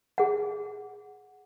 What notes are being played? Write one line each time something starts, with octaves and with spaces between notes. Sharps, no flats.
G#4 F#5